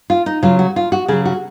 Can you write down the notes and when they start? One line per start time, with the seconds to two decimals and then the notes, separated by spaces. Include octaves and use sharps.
0.10 F4
0.26 D#4
0.43 C#3 F#3 F4
0.59 F#4
0.76 F4
0.92 F#4
1.08 C#3 F#3 G#4
1.25 F#4